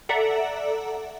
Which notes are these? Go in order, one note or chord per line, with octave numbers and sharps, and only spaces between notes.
A4 D5 E5 F#5 A#5